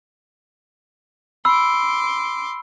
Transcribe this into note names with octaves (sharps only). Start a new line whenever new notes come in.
B5 C6 D6 E6